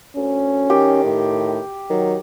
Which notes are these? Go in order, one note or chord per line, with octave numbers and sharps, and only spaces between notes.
D2 C#4
D#3 G4
A2
D#3 F#3